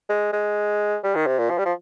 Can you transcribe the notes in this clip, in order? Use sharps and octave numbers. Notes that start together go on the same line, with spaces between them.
G#3
G#3
G3
D#3
C3
A#2
F3
G3
F3